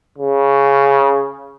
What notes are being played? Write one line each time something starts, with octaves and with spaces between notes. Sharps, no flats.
C#3